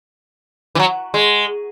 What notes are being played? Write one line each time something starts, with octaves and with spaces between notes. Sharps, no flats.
E3
F#3
G#3